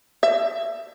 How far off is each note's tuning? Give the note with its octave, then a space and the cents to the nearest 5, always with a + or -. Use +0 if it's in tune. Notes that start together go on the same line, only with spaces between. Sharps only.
E5 +30